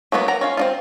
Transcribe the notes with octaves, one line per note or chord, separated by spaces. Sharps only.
F#3 A#3 B3 F#4 B4
A#4 F#5 A#5
C#4 F4 F5
C4 D#4 F4